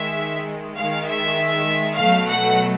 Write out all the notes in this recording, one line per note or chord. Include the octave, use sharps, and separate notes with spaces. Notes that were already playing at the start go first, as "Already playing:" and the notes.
Already playing: D#3 G#3 E5
D#3 G#3 F5
E5
B2 F#3 A3 F5
F#5